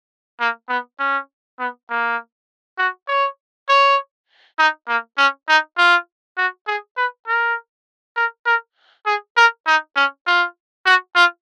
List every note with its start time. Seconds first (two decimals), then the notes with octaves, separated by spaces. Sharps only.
0.40 A#3
0.69 B3
0.99 C#4
1.59 B3
1.90 A#3
2.78 F#4
3.08 C#5
3.69 C#5
4.59 D#4
4.88 A#3
5.18 C#4
5.48 D#4
5.78 F4
6.38 F#4
6.67 G#4
6.97 B4
7.27 A#4
8.16 A#4
8.46 A#4
9.06 G#4
9.37 A#4
9.67 D#4
9.96 C#4
10.27 F4
10.86 F#4
11.15 F4